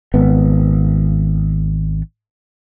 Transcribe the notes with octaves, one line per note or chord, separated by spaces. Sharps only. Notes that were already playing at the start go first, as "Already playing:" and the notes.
G#1 B3